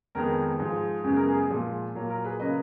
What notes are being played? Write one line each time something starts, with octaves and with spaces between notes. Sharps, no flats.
F2 D#3 G#3 B3 A#4
G#2 F3 G#3
F#2 C#3 G#3 B3 G#4
A#4
G#4
A#2 F3 G#3
A#2 F#3 A#3
A#4
G#4 B4
C#3 F#3 A#3 B4 D#5